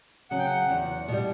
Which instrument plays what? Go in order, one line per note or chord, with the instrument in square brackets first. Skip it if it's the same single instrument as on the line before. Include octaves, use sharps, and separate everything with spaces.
[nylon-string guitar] C#3 F#3 [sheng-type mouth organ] F#5
[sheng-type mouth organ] G5
F#5
[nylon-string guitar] E2
B2 G3